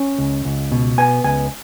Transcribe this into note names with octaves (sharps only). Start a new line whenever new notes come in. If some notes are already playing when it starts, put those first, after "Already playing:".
Already playing: C#4
C#2
C#2
B2
B3 G#5
C#2 G#5